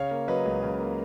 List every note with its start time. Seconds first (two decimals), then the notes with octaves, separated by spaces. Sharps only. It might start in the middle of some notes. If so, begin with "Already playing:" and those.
Already playing: C#3 C#5 F5
0.11 A#3
0.28 F#3 B4 D#5
0.45 C#2
0.63 C#3
0.79 A#3